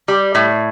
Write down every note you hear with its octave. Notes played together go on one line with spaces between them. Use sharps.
G3
A2